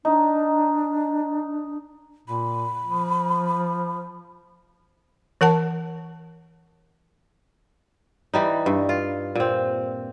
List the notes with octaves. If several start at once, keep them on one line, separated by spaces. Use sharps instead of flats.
D4 D#4
A#2 B5
F3
E3 A#4 F#5 A5
E3 G3 D#4
G2
F4
A#2 C4